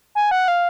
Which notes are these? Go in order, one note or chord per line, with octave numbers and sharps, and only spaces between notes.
G#5
F#5
F5